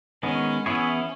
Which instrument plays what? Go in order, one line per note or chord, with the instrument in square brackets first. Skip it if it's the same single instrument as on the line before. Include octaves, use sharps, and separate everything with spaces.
[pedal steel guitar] D#3 G#3 B3 [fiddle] C#4
[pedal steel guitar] E3 B3 E4 G#4 C#5 [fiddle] C#4